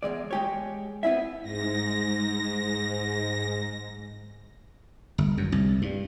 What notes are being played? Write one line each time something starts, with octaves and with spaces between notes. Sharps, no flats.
E2 A#2 G#3 D5
G#3 G4 C#5
B3 C4 E4 E5
G#2 A#6
G1
F#2
C2
G2